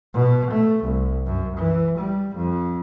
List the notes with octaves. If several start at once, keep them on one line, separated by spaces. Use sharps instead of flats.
B2
A3
C2
F#2
E3
G3
F2